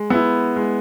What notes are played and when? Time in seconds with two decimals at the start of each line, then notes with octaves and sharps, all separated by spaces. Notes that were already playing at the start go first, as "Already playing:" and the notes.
Already playing: G#3
0.10 B3 E4
0.56 G#3